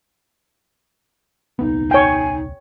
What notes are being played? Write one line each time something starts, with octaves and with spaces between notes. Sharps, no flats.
D#1 C2 B3 D#4
C#5 G5 G#5